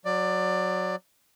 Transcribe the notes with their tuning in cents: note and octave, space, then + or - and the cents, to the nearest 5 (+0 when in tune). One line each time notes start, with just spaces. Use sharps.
F#3 -10 D5 +15